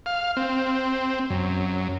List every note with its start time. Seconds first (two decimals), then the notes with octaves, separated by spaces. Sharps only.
0.06 F5
0.37 C4
1.30 F#2